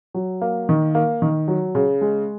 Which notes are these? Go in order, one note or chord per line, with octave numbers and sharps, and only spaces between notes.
F#3
A#3
D#3
A#3
D#3
F#3
C#3
G#3